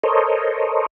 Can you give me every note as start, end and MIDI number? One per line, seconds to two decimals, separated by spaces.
0.04 0.86 69
0.04 0.86 70
0.04 0.86 72
0.04 0.86 73
0.04 0.86 75